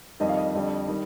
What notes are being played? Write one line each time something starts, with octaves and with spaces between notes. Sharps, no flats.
F2 D#3 G3 D#5
F5
D#5
F2 D3 G3
D#3 G3